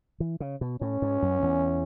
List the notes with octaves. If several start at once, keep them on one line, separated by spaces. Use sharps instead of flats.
E3
C#3
B2
A2 C#4
G#2
F#2
E2